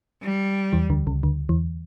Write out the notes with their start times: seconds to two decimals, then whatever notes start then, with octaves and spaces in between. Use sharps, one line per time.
0.22 G3
0.73 E2 E3
0.90 D2 D3
1.07 C#2 C#3
1.23 D2 D3
1.49 E2 E3